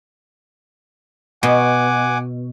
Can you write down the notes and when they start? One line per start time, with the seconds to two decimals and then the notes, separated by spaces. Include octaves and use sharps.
1.43 B2 F#5 G#5 D6